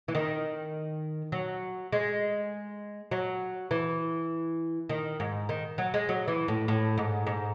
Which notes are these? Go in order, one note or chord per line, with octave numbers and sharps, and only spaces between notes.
E3
D#3
F#3
G#3
F#3
E3
D#3
G#2
D#3
F#3
G#3
F#3
E3
A2
A2
G#2
G#2